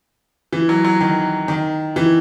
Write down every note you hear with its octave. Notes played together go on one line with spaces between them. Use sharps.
E3
F#3
F#3
D#3
D#3
E3